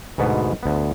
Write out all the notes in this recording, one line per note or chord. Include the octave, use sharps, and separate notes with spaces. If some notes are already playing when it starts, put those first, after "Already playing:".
D2 G#2 B2 B3
D2 B3